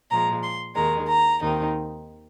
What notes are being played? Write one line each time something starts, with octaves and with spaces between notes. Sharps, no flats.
A#2 F3 G#3 A#5
C6
D#2 D#3 G#3 A#5
A#5
D#2 D#3 C4 D#4